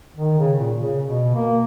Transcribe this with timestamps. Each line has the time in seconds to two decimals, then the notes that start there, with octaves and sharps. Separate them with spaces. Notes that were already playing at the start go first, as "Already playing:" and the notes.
0.15 D#3
0.38 C#3
0.59 A#2
0.79 C#3
1.02 B2
1.35 A#3